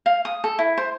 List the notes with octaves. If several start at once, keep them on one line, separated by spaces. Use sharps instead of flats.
F5
D#6
A4
E4
C5